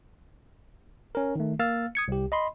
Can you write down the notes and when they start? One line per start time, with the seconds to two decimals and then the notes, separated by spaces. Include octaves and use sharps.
1.15 C#4 A#4
1.35 D#3 A3
1.59 A#3 F5 E6 F6 A6
1.95 D#6 G#6 C#7
2.08 C2 G4
2.32 D#5 B5 C6